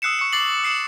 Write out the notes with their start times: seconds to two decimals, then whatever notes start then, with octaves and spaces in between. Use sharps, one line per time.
0.02 D#6 E6 F#6 C7 C#7 E7
0.19 C#6 C#7
0.33 C#6 D6 A6 C7 F#7
0.63 D#6 C7 C#7 E7 F#7